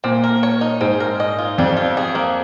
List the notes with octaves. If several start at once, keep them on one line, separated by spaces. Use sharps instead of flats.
A#2 C4
A#4
C#5
D#4
G#2 C4
A#4
D#5
F4
F2 G3
F4
G#4
A#3